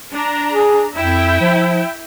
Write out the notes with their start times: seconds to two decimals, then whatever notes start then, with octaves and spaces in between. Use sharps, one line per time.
0.12 D4 A#5
0.52 G#4
0.96 F2 E4 E5 G5
1.41 F3